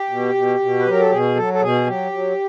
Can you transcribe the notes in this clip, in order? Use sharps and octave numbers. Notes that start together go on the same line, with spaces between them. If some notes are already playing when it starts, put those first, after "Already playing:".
Already playing: G4
B2
B2
B2
B4
F#3 A#4
A4
B2 G#4
F#3 A4
A4
B2 G#4
F#3 G4
F#3